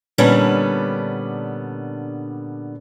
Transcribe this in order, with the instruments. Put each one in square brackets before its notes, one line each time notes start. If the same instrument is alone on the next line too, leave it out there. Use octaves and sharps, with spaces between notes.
[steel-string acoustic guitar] A#2 D3 G3 B3 C#4 D4